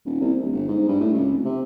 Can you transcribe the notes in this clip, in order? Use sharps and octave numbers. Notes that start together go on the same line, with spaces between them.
D#1
C2
D1
G1
G#2
G2
A2
C#2
F1
C3